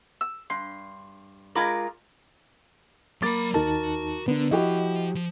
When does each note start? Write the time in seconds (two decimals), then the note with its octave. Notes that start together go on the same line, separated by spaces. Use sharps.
0.21 E6
0.50 G2 C6
1.55 G#3 F4 A#4 B5 D6
3.22 F#3 A#3 B5 D6 A6
3.54 D#2 D#4 F#4 A#4 A5
4.28 D3 B3 D4
4.51 F3 E4 F#4 G4 D#5
5.15 F3